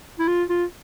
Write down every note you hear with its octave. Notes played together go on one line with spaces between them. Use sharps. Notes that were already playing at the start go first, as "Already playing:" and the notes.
E4
F4
F4